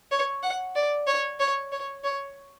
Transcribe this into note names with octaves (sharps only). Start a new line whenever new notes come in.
C#5
F#5
D5
C#5
C#5
C#5
C#5